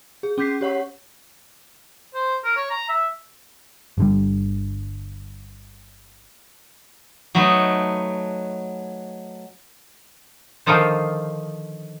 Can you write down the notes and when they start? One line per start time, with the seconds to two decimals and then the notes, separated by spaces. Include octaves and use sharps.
0.23 G#4
0.38 C#4 D6 G6 B6 C7
0.61 G4 C#5 F#5 C#6
2.14 C5
2.44 A#4
2.56 C#5
2.70 A#5
2.89 E5
3.98 G1 D3 G3
7.35 F#3 A3 B3 D#4
10.66 D3 D#3 F3 D#4 F4 C5